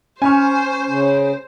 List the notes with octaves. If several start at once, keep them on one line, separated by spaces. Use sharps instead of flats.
C#4 C5 G#5 B5 C#6 F6
C#3